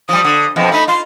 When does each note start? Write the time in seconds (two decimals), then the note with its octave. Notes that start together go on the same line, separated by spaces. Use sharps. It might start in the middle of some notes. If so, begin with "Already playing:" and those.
0.09 F3 G3 D#6
0.24 D3
0.56 F2 B2 F3
0.72 A3 D#4 B5
0.88 F4 C6